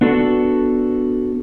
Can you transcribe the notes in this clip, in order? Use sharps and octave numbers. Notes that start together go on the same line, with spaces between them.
B3 D4 F#4 A4